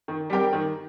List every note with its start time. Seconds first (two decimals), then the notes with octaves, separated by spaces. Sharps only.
0.08 D#3
0.30 G3 C4 G4 A#4
0.53 D#3